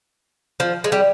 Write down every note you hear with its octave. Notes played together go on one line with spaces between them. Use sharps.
F3
G#3
G3